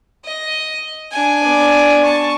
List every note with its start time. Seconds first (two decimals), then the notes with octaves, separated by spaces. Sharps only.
0.24 D#5
1.11 D4 G#5
1.43 B3 D5
2.05 A5 C#6